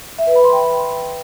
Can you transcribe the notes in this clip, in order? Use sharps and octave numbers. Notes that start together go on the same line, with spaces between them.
E5
B4
B5
C6
G5